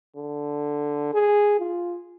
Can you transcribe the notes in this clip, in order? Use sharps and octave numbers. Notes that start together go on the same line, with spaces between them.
D3
G#4
F4